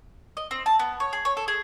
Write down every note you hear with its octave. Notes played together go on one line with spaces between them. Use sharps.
D#5
C4
A5
B3
C#5
G#4
C#5
A4
G#4